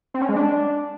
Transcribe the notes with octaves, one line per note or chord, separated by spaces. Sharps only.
C4
C#4
G#3
D4